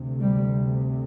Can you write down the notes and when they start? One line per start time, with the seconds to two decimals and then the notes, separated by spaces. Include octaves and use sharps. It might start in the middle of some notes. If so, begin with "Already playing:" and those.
Already playing: D2 C3
0.20 G3